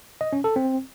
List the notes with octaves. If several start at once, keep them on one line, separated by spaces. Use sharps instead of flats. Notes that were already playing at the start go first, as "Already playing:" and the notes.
D#5
C#4
A4
C4